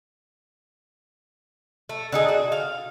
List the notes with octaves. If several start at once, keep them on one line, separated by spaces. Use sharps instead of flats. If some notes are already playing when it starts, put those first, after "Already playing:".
A3
D3 D#4 G#4
F#4
F5